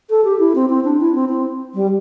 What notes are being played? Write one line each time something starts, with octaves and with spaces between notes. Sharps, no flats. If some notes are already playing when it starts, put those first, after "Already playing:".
A4
G4
E4
C4
C4
D4
E4
C4
C4
G3